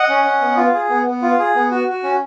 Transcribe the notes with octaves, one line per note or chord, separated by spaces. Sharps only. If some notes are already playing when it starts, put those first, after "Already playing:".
Already playing: D#5 F#5
C#4
C#4
B3
F4
G#4
B3
B3
F4
G#4
B3
F#4
F#4
C#4